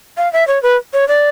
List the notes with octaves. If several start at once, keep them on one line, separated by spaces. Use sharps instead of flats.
F5
E5
C#5
B4
C#5
D5